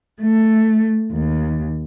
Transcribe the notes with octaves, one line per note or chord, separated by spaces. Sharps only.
A3
D#2